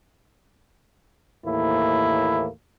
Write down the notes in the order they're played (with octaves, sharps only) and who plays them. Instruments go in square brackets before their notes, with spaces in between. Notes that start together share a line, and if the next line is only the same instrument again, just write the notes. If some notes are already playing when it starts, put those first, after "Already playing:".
[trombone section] D#2 A2 E3 A#3 E4